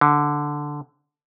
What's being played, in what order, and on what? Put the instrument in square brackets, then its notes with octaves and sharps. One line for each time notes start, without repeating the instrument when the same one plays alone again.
[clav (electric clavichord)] D3